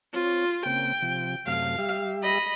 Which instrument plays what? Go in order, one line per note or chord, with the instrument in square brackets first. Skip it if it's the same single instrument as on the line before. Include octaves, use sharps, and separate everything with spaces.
[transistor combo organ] C4 C#5 [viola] F4
[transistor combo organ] C#3 A#3 C4 [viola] G5
[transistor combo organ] C3 F3
[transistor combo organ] F#2 C3 A3 [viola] F5
[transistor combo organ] G3 G4 E5
[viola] D#5 B5